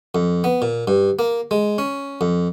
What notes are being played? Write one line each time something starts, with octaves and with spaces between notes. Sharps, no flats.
F2
B3
A#2
G2
A#3
G#3
C#4
F2